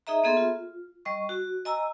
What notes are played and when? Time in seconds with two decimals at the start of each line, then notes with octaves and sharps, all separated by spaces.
0.07 D#4 G#4 D#5 E5 A#5
0.24 A#3 B3 G#4 A4 E5 C6
0.37 F4
1.05 G3 D#5 C#6
1.29 F#4
1.65 D#5 G#5 A#5 E6